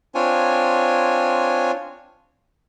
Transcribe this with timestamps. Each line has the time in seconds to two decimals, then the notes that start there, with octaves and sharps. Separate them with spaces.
0.15 C4 D4 F4 C#5 G#5